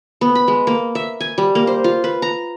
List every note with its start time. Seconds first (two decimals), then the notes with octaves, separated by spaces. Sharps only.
0.21 B3
0.35 B5
0.48 G#3
0.67 A#3
0.95 E5
1.21 G#5
1.38 G3
1.55 A#3
1.67 C5
1.84 F4
2.04 B4
2.22 A#5